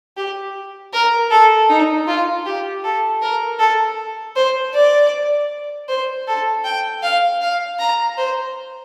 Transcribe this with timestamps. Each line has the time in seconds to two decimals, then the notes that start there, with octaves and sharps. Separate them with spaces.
0.17 G4
0.93 A#4
1.31 A4
1.69 D#4
2.07 F4
2.46 G4
2.84 A4
3.21 A#4
3.60 A4
4.36 C5
4.74 D5
5.88 C5
6.27 A4
6.65 G5
7.03 F5
7.41 F5
7.79 A#5
8.18 C5